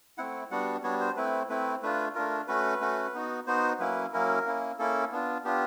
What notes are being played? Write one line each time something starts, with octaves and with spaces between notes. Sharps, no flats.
A3 C4 E4 F#5
G3 B3 D4 F#4 F#5
G3 B3 D4 F#4 C#5
C5
A3 C4 E4 B4
A3 C4 E4 B4
A3 D4 F4 B4
A3 D4 F4 A#4
A3 C#4 F#4 B4
A3 C#4 F#4
B3 D#4 F#4
B3 D#4 F#4 C5
F#3 A#3 C#4 E4 B4
F#3 A#3 C#4 E4 A#4
A#3 C#4 E4
A#3 C#4 E4 A4
B3 D4 F4
B3 D4 F4 G4